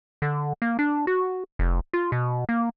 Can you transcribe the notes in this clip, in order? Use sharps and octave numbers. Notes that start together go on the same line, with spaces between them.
D3
A#3
D4
F#4
F1
F4
B2
A#3